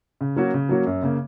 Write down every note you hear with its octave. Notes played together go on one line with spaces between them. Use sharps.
C#3
F#3 A#3 C#4 F#4
C#3
F#3 A#3 C#4 F#4
F#2
C#3 A#3